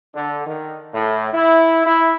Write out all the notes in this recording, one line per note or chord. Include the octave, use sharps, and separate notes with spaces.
D3
D#3
A2
E4
E4